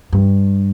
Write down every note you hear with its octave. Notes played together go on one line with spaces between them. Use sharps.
G2